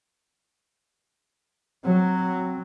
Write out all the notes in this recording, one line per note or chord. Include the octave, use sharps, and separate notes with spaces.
F#3 C4